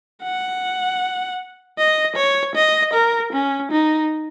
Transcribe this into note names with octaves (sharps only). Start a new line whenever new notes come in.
F#5
D#5
C#5
D#5
A#4
C#4
D#4